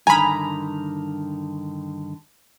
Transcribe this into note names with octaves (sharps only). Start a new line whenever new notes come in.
G2 D3 D#3 G#5 A#5 B5